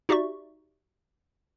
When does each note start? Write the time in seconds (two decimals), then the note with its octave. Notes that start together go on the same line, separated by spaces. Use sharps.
0.09 D#4 F#4 G4 D5 E5 C#6